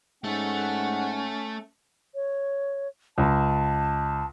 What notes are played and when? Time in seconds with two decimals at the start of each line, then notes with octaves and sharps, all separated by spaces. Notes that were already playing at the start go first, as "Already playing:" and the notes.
0.24 G#2 A3 C#4 A4 F#5
2.15 C#5
3.18 C#2 A5